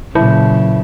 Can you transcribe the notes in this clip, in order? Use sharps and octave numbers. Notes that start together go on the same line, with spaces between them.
A#2 C#3 F#3 E4